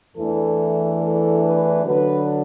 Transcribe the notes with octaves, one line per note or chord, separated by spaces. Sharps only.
E2 E3 A3 D4 A4
A4
B4
D3 F#3 D4 B4